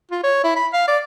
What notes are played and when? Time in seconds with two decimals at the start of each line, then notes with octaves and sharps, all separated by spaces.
0.11 F4
0.23 C#5
0.44 E4
0.56 B5
0.74 F5
0.88 D5